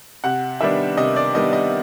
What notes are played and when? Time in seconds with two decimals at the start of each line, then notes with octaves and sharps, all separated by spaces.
0.24 C3 F#5
0.61 D#3 G3 B3 D4 E5
0.97 C3 D#5
1.16 D5
1.34 D#3 G3 B3 D4 D#5
1.53 D#5